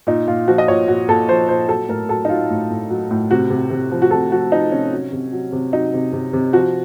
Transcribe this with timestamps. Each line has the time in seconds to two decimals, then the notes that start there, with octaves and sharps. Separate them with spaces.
0.07 A#2 D#4
0.27 A#2 F4
0.48 F3 F#4
0.58 D#5
0.68 A#2 C#5
0.88 A#2 F#4
1.08 A#2 A4
1.29 F3 C5
1.49 A#2 C5
1.68 F#3 A4
1.89 A2 A#4
2.09 F#3 A4
2.25 D#4
2.29 F#3 F4
2.50 A2
2.71 A2
2.90 F#3
3.11 A2
3.31 C3 F#4
3.50 C3
3.70 C3
3.91 F3
4.02 F#4
4.11 C3 A4
4.32 F3 F#4
4.52 F3 D#4
4.72 C3 C#4
4.93 F#3
5.12 C3
5.33 F#3
5.52 C3
5.73 F#3 D#4
5.94 C3
6.13 C3
6.33 C3
6.53 F3 F#4